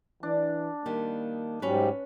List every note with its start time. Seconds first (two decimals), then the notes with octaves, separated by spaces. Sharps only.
0.23 E3 D4
0.86 D#3 G3 A#3
1.62 G#2 F#3 G3 C#4 B4